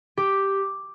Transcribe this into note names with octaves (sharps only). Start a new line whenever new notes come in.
G4